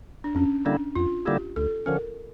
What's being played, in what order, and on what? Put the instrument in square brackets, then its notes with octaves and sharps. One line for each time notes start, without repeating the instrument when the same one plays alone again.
[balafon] D4
[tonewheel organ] F2 [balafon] C#4
[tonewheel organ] D3 G3 A#3 E4 [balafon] D4
[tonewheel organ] F2 [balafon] F4
[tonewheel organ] D3 G3 A#3 E4 [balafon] G4
[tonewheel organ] D2 [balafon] A4
[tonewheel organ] D3 F3 C#4 [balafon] A#4